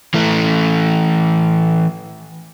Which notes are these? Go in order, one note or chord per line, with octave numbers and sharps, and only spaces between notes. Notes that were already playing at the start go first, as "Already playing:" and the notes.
E3 A3